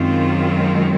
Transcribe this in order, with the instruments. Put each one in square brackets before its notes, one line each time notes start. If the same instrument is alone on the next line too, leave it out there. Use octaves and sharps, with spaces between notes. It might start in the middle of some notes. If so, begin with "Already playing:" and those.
Already playing: [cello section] F#2 D#3 G#3 C4 F4